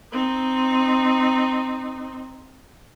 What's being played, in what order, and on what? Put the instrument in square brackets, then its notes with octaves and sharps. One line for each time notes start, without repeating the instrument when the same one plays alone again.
[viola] C4 D#4